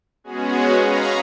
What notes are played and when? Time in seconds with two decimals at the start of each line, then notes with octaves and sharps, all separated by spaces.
0.24 G#3 B3 C#4 F#4 G#4
0.77 C#5 D#5 F5 A#5 B5 C#6